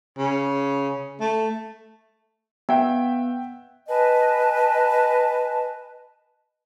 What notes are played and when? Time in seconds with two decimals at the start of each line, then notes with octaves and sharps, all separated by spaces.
0.18 C#3
1.20 A3
2.69 B3 E5 F#5 G5
3.88 B4 D#5 G#5 A5